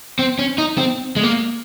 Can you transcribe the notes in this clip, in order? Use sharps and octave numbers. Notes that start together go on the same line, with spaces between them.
C4
C#4
D#4
C4
G#3
A#3